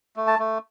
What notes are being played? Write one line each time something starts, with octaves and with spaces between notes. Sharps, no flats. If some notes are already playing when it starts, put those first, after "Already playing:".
A3
A5
A3